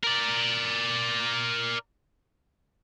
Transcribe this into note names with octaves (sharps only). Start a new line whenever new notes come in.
A#4 D5